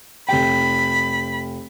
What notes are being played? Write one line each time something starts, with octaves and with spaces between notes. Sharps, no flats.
F1 G5 B5